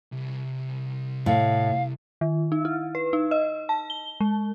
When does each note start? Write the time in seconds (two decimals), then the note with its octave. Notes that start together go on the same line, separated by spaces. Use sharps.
0.12 C2
1.26 A2 F5
2.21 D#3
2.52 D#4
2.65 E4
2.95 B4
3.13 D#4
3.31 D#5
3.69 A5
3.90 G7
4.20 G#3